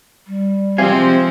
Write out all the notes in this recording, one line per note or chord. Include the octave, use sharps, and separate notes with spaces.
G3
C3 F3 G#3 C4 F5 G#5